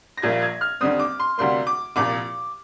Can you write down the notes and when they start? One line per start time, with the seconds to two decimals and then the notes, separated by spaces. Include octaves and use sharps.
0.17 A#6
0.22 A#1 A#2 G3 A#3 G#6
0.42 G#6
0.61 F6
0.81 D#2 D3 G3 C4 D#6
0.99 D6
1.20 C6
1.38 D2 C3 G3 A#3 C6
1.67 D6
1.96 C2 A#2 F3 D6